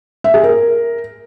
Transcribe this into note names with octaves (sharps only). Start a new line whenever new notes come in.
E5
G#4
A#4